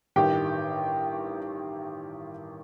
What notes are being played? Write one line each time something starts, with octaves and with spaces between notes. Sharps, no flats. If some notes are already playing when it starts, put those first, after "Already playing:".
A1 G2 D#3 G4 G5